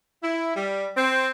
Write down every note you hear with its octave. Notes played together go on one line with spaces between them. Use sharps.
E4
G3
C4